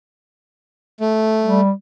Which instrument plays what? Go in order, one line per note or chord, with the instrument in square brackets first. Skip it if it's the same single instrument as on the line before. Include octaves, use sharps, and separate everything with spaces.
[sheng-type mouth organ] A3
[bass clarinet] G3